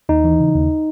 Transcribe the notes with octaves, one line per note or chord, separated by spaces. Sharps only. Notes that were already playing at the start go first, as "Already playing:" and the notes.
D#2 D#4
E3
C#3
D#2